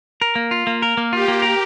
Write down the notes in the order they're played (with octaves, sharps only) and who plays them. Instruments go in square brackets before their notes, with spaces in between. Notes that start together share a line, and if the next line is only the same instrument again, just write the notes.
[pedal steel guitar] A#4
A#3
F4
A#3
A#4
A#3
[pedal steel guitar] F4 [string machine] G4
[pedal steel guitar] A#3
A#4